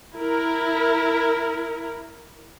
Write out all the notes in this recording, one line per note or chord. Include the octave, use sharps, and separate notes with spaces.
E4 A#4